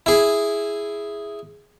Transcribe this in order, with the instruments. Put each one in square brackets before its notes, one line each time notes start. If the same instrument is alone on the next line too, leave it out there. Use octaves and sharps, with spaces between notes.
[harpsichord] E4 G#4